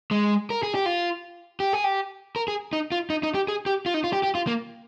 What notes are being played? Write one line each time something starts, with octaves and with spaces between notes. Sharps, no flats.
G#3
A#4
G#4
G4
F4
G4
G#4
G4
A#4
G#4
D#4
F4
D#4
D#4
G4
G#4
G4
F4
D#4
F4
G4
G4
F4
A#3